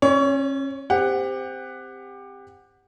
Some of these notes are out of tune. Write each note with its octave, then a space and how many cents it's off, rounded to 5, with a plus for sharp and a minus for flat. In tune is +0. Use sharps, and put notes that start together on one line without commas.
C#4 -30 C#5 +25
C4 -10 G4 +20 F#5 +0